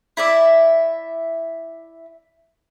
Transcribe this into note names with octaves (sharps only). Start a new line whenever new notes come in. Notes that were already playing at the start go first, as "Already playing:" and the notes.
E4 D5 E5